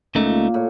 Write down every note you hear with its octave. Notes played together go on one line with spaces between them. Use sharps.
C#2 A#2 C#3 A3 D#4
A2